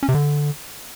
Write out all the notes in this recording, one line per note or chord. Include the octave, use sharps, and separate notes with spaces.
C#4
C3
D3